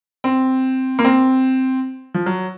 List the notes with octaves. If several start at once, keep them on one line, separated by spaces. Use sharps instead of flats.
C4
A#3
C4
F3
F#3